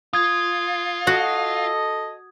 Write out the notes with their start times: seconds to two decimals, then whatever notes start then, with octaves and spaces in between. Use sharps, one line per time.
0.13 F4 D#6 G#6
1.07 F#4 A4 D#5 F#5